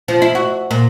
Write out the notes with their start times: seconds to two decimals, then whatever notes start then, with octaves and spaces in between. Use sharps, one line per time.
0.08 F3
0.22 E4
0.35 F#4
0.71 A#2